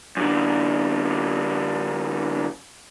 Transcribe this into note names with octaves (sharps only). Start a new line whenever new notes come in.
F#2 D3